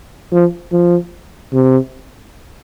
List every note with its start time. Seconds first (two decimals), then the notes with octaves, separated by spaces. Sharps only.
0.32 F3
0.72 F3
1.53 C3